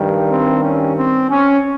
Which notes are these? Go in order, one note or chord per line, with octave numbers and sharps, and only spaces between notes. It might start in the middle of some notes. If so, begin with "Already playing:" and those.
Already playing: G2 D#3 G3
C4
C#4
C4
C#4